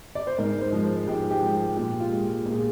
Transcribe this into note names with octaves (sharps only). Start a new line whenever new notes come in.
D5
C5
G#2 A#4
C5
F3 G#3
C5
G#2 G4
G4
F3 G#3
G4
A#2 G4
F4
G#3
A#2
G#4